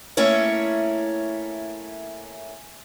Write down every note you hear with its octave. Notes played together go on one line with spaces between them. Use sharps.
A3 A#3 C#4 E4 C#5